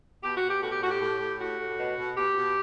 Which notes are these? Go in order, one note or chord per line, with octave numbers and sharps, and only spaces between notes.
B2 G4
F#4
B2
G4
A2 F#4
G4
A2 F#4
G4
A2
A2
A2 F#4
A2
B2
B2
B2 G4
B2